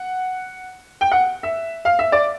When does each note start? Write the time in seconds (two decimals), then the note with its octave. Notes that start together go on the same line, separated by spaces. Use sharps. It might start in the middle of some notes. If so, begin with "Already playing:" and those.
Already playing: F#5
1.01 G5
1.12 F#5
1.43 E5
1.85 F5
1.99 E5
2.12 D5